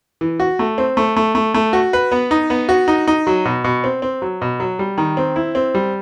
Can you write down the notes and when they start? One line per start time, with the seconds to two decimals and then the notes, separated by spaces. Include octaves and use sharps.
0.21 E3
0.40 F#4
0.59 A3
0.78 C4
0.97 A3
1.16 A3
1.35 A3
1.54 A3
1.73 F#4
1.93 B4
2.12 B3
2.31 D#4
2.50 B3
2.69 F#4
2.88 D#4
3.07 D#4
3.27 F#3
3.45 B2
3.64 B2
3.84 C4
4.02 C4
4.22 F#3
4.42 B2
4.60 F#3
4.79 G3
4.98 D#3
5.17 C4
5.36 E4
5.55 C4
5.75 G3